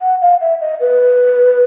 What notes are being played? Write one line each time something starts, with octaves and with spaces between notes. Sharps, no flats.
F#5
F5
E5
D#5
B4